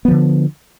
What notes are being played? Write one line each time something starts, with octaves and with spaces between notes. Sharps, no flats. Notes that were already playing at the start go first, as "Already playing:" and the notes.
D3 F3 B3